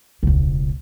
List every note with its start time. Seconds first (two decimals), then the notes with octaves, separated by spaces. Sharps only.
0.23 E1 C#2